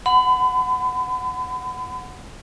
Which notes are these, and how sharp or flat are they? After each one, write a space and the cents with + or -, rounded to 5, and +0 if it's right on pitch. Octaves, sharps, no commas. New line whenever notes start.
F#5 +0 B5 +40